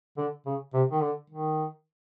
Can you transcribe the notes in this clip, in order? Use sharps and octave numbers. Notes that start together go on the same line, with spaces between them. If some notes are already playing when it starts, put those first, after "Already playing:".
D3
C#3
C3
D#3
D3
D#3